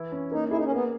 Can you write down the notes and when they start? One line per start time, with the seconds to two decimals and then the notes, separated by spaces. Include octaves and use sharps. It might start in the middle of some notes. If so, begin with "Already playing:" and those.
Already playing: E3 E4
0.12 C#4
0.31 A#3 D#4
0.50 E4 G#4
0.57 D#4
0.64 C#4
0.71 A#3 B3